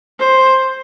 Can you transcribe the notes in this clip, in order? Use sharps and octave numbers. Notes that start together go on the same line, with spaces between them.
C5